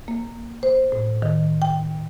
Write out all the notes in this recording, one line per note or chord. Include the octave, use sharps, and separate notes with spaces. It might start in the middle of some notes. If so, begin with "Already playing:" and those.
A#3
C5
A2
D#3
G5